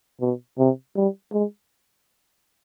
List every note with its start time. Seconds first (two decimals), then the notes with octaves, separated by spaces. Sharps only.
0.21 B2
0.58 C3
0.96 G3
1.32 G#3